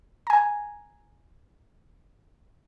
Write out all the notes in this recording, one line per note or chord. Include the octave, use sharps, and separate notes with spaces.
G#5 A#5